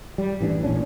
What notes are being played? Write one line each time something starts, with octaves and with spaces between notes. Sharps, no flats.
G3
A1 E3 G3 D4
A1 A#2 C#4 D4